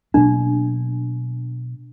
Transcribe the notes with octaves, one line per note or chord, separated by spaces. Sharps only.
B2 F#3 A#3 D4